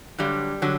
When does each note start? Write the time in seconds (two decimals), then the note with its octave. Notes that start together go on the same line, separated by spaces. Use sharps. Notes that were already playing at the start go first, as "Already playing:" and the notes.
0.18 G2 D3 F#3 G3
0.62 D3 F#3